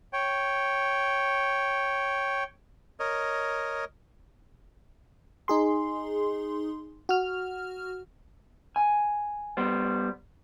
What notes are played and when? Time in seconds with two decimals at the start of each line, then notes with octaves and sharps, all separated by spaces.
0.13 C#5 G5
3.00 A#4 C#5 D#5
5.48 D#4 G#4 C6
7.09 F#4 F6
8.76 G#5
9.57 G3 B3 C5